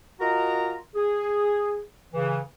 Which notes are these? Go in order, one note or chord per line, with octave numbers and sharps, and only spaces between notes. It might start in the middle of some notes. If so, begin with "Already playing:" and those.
F4 F#4 A#4 D#5 A#5
G#4
C#3 E3